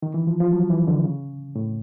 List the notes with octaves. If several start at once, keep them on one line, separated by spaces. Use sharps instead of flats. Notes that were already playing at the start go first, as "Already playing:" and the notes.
D#3
E3
F3
F3
F#3
E3
D3
C#3
A2